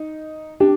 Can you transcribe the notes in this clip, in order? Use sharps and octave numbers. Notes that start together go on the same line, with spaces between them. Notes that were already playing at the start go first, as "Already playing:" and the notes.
Already playing: D#4
D4 G4